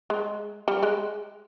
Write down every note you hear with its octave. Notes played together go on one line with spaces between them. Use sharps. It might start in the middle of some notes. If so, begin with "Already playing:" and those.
G#3
G3
G#3